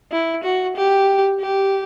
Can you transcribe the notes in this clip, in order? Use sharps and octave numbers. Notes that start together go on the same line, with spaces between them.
E4
F#4
G4
G4